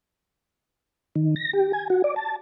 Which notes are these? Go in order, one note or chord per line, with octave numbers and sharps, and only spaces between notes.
D#3
A#6
G4
G#5
F#4
D5
A5